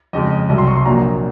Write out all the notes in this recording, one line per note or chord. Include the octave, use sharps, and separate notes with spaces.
F2 C#3 G#3 D#5
C2 C3 F#3 D#5
C6
C#6
C6
A#1 A#2 F#3 A#5